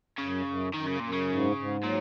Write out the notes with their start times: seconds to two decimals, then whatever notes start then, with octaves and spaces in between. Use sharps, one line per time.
0.18 F#2 C#3
0.46 F#2
0.74 F#2 D#3
0.87 C#3
1.00 F#2 A#2
1.13 C#3
1.29 G#2
1.56 G#2
1.84 A#2 F#3